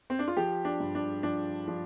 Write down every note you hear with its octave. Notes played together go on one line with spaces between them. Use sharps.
C4
D4
F4
F3 G4
D4
G2
D4
F3 D4
F3 D4